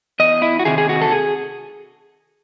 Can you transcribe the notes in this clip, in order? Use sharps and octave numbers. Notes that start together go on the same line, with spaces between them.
E2 D#5
E4
F#4
C3 D#3 G#4
G#4
F#4
A4
G#4